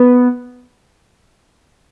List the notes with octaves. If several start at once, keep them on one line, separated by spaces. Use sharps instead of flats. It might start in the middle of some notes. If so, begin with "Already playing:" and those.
Already playing: B3